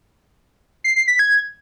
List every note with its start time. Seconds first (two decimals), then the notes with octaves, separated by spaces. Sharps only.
0.84 C7
0.96 C7
1.08 B6
1.19 G#6